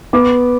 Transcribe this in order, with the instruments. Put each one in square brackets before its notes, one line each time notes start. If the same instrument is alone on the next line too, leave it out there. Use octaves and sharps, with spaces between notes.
[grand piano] B3 D6